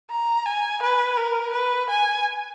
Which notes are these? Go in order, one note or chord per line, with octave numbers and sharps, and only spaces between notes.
A#5
G#5
B4
A#4
B4
G#5